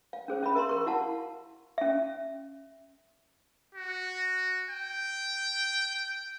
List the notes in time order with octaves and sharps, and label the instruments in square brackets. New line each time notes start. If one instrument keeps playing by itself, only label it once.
[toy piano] F5
C#4 G#4 C5
C#4 E5 F5 B5
A#4 E5 A#5 C6
A#4 C#6
E4 F#4 F5 F#5 A5
C#4 E5
[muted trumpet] F#4
G5